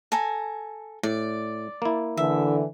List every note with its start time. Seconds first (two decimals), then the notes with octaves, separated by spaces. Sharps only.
0.12 A4 G#5 A#5
1.03 A2 D5
1.82 A#3 E4
2.17 D3 E3 E5